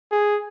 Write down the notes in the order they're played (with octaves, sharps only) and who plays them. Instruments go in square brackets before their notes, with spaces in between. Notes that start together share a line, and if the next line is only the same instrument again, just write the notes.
[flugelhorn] G#4